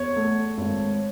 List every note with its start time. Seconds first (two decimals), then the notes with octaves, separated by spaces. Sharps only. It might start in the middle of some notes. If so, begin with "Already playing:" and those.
Already playing: E2 C#5
0.16 A3
0.58 G#1